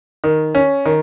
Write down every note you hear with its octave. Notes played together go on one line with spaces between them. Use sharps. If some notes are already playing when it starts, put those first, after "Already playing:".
D#3
C#4
D#3